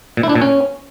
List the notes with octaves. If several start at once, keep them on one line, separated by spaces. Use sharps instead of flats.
A#2
E4
D4
A#2
C#4